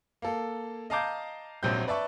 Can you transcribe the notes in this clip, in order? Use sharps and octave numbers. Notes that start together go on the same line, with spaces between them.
A#3 A4
D#5 F5 A5 A#5 D6 G6
D#1 A#1 F#3 C4 G6
B4 D5 E5 A5 C#6